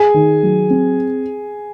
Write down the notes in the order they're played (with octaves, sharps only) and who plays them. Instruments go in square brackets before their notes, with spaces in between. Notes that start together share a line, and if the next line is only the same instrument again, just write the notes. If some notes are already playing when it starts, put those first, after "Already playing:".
Already playing: [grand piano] G#4 G#5
[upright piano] D#3
F#3
C4